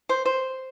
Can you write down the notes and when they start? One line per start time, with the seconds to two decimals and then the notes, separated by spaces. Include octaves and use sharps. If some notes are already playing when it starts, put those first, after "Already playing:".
0.09 C5
0.25 C5